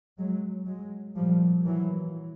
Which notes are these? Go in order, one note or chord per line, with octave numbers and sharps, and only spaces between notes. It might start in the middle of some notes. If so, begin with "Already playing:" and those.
F#3 G#3
F#3 G#3
A#2 F3 G3
E3 F#3